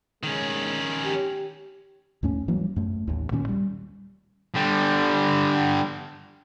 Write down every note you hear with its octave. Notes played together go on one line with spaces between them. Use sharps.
D#3 G#3 C#4
G4
D#2 G#2 A3 C#4
E3 F#3 G3 A#3
F#2 A3
A1 D#2
D2 A#2 D#3 C#4
G3
D3 G3